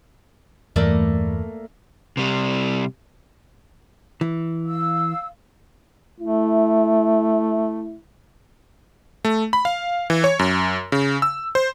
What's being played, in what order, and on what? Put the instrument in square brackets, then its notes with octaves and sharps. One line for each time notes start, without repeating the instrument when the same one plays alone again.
[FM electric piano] E2 G2 E3 [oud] A3 A#3 D5
[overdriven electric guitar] C3 G3
[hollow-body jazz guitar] E3
[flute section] F5 E6
[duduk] A3 [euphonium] E4
[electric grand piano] A3
B5
F5
E3
C#5
F#2
C#3
E6
C5